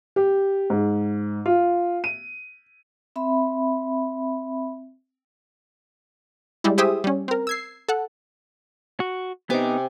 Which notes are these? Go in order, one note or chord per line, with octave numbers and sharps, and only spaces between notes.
G4
G#2
F4
D#7
C4 E5 B5
G3 G#3 E4
E4 G4 G#4 C5 E5 D#6
G3 C#4
C4 A#4
E6 G#6 C7
A4 F#5
F#4
C3 B3 D#4 G#5 D6